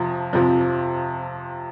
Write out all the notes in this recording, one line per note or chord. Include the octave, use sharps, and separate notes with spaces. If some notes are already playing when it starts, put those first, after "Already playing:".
Already playing: F2 C3 F3
F2 C3 F3